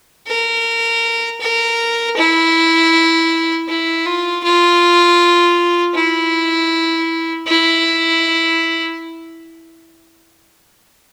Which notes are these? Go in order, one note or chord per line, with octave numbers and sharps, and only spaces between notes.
A#4
A#4
E4
E4
F4
F4
E4
E4